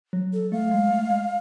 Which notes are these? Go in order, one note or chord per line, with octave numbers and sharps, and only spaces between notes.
F#3
A4
A3 F5
G#3
A3
G#3